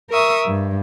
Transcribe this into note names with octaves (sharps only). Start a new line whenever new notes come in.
A#4 E5 C#6 D#6
G2